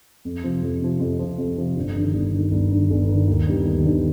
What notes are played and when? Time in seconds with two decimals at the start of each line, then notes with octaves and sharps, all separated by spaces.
0.25 F2
0.44 C3 F3
0.62 F2
0.81 C3 F3
1.00 F2
1.19 C3 F3
1.38 F2
1.57 C3 F3
1.77 G1
1.95 G2 D#3
2.13 G1
2.33 G2 D#3
2.51 G1
2.71 G2 D#3
2.90 G1
3.09 G2 D#3
3.28 D#2
3.47 D3 G3 B3 D#4
3.65 D#2
3.85 D3 G3 B3 D#4